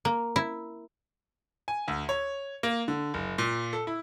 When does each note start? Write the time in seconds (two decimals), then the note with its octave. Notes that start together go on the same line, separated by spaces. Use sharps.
0.05 A#3
0.36 E4
1.68 G#5
1.88 D2
2.09 C#5
2.63 A#3
2.88 D3
3.14 F#1
3.38 A#2
3.73 A4
3.87 E4